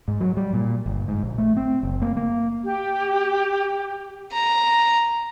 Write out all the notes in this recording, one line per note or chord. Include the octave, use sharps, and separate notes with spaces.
G#2
F#3
G3
A#2
G1
G#2
A#1
A3
C4
F#1
A#3
A#3
G4
A#5